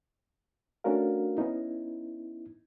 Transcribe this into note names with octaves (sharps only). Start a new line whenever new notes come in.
A3 C#4 D4 F#4 A#4 F5
B3 C#4 D#4 E4